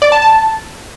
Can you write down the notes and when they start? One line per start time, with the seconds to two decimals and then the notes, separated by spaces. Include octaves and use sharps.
0.02 D5
0.12 A5
0.22 A5